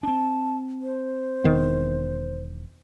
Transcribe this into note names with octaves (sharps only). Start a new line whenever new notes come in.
C4 D4 A5
C5
E1 D#3 B3